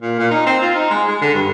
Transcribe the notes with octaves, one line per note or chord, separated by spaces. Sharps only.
A#2
A#2
D#4
C4
F4
D#4
G#3
G#3
D3
G2